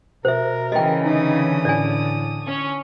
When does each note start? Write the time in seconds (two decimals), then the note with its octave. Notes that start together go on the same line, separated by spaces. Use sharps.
0.25 B2 A#4 C5 E5
0.72 C#3 E3 D#5 G5
1.06 D3 D#4 D#6
1.65 A2 D5 G#5
2.44 C#4 C#5